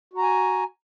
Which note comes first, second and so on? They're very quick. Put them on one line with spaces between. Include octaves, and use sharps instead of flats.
F#4 A#5 G#5